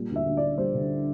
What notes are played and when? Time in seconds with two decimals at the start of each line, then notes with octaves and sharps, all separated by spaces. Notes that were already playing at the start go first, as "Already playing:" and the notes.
Already playing: A#2 G3
0.10 D2
0.16 E5
0.26 D2
0.37 D5
0.42 D2
0.58 G3 C5
0.75 D3